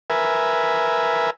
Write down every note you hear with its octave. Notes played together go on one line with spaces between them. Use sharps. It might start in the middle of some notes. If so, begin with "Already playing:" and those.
A#4 B4 E5 G#5